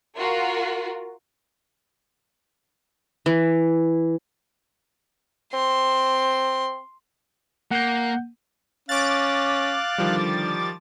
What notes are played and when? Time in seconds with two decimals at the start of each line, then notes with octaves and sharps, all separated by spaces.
0.18 F4 F#4 A#4
3.26 E3
5.53 C4 C6
7.71 A#3 F#5 G6
8.89 C#4 F5 D6 F#6 A6
9.98 D3 D#3 F3 G3